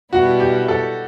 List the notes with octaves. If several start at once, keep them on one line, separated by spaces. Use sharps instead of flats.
B2 G3 B3 E4 F#4
G4
A4